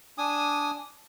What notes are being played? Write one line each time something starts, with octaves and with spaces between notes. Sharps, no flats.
D4 G#5 D#6